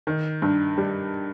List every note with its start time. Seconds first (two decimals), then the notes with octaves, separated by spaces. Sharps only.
0.07 D#3
0.42 G2
0.78 G3